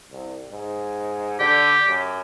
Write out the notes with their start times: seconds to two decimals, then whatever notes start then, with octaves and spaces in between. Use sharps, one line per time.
0.11 C2
0.51 G#2
1.40 D3 G4
1.88 F#2